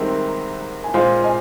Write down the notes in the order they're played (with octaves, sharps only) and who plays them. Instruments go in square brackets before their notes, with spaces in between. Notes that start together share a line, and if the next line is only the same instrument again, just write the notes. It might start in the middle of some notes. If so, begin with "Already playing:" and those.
Already playing: [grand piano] C2 C3 D#3 G#3 C4 [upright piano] A#4
[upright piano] G#5
[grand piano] A#2 G#3 F4 [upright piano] C5 F5
[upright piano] D#5 G#5